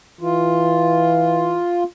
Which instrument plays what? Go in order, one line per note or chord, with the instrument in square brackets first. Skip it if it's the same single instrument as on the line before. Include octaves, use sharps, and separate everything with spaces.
[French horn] E3 [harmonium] F4